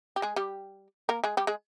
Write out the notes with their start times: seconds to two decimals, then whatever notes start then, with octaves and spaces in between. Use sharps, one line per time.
0.16 G4
0.22 G#3 G#4
0.36 G3 G4
1.09 A#3 A#4
1.24 G#3 G#4
1.37 G3 G4
1.47 G#3 G#4